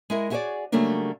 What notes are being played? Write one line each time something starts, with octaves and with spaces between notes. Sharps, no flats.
G#3 E4 A#4
E4 F#4 G#4 A4 C#5 D5
C#3 F#3 G3 A3 A#3 D4